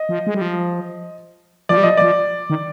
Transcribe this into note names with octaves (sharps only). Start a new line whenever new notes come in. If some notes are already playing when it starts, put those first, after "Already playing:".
Already playing: D#5
F3
G#3
G3
F3
F3 D5
G3
F3 D#5
F3 D5
D#3